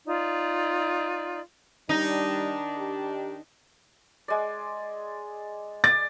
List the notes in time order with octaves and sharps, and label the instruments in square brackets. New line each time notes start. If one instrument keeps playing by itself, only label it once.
[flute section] D#4 F4 D5
[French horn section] D#3 D4 [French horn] G3 [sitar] D#4
[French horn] G4
[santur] G#3 D5
[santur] D5 [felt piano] A6